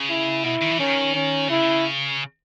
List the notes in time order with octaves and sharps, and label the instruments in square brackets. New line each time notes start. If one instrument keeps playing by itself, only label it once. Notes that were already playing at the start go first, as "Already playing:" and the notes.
Already playing: [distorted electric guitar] C#3
[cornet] E4
[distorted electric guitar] B2 [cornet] E4
[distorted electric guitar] D#3
E3
[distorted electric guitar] D#3 [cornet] C#4
[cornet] C#4
[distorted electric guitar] C#3 [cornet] E4